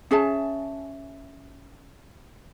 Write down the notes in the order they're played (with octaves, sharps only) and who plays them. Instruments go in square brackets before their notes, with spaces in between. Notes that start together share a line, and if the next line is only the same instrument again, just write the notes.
[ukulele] C#4 G#4 E5 A5